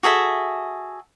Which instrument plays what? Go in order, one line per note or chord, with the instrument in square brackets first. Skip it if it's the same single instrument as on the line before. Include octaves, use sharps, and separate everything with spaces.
[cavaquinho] F#4 G#4 A4 E5